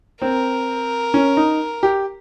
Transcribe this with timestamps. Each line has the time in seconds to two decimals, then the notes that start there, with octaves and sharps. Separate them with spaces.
0.22 C4 A#4
1.14 C#4
1.37 D#4
1.83 G4